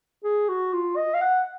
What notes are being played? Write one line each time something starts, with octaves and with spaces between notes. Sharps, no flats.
G#4
F#4
F4
D#5
F5
F#5